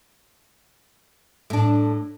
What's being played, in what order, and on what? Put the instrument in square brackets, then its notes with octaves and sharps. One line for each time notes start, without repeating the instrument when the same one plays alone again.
[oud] A2 D4